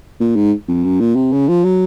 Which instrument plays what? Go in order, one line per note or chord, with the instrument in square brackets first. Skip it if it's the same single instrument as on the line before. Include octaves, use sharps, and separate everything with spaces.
[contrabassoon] A#2
G#2
F2
F#2
A#2
C3
C#3
F3
F#3